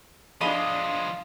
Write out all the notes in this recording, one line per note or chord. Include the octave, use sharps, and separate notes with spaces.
F3 G#3 D4 D#5 F5 B5